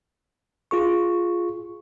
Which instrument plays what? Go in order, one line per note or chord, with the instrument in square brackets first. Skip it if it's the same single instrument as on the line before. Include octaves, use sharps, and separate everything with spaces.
[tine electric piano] F4 G#4 C#6